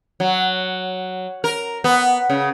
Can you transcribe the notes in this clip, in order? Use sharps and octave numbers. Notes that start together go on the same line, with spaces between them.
F#3
A#4
B3
C#3